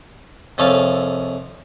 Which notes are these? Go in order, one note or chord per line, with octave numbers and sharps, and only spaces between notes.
C2 F2 C#4 A4 F5